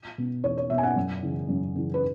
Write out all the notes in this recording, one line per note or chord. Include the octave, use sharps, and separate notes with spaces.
B2
E2 C#5
C#5
B2 E5
G#5
F#5
F#2
C#3 E3
F#2
C#3 E3
B4